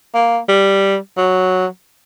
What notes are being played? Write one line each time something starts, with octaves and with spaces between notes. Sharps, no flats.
A#3
G3
F#3